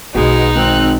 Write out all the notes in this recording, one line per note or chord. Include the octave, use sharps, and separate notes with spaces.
B1 B2 D#3 G#3 B3 D#4
G#1 C4 F#6